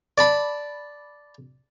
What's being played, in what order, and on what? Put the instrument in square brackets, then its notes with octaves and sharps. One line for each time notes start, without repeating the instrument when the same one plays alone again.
[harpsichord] D5 A5 B5